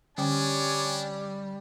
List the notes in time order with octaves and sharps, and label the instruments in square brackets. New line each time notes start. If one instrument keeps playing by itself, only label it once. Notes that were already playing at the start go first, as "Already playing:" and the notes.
[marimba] D3 C#4 G5 [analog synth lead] G3 [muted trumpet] D4 [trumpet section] C#5 G#5 D6